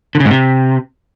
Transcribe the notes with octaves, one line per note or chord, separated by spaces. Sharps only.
D3
C#3
G#2
C3